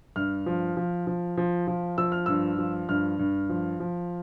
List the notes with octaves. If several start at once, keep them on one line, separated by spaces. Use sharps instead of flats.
G2 F6
F3
F3
F3
F3
F3
F3 E6
F6
G2 E6
F3
G2 F6
G2
F3
F3